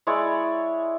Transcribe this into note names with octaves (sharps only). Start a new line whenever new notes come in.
G#3 E4 C#5 D5